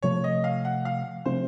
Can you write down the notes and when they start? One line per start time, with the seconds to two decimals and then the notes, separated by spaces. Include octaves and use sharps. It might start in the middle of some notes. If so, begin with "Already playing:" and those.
0.02 C3 F3 A3 C#5
0.24 D#5
0.44 F5
0.65 F#5
0.85 F5
1.26 C3 F3 A3 C4 C5